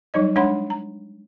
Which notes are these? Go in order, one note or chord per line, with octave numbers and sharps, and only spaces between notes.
F#3 G3 D#4 C#5 D#5
G#3 D4 C#5 F#5 B5 C6
A#5